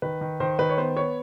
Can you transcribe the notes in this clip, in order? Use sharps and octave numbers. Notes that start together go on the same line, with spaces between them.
D#3 B4
D#3
D#3 C5
D#3 B4
C#5
B3 C5
B3 C#5